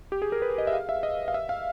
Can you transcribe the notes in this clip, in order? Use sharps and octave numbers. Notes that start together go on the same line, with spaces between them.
G4
G#4
A#4
B4
D#5
E5
F5
E5
D#5
F5
E5
F5